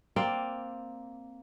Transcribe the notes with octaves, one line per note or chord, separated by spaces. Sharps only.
A#3 C4 D5 F5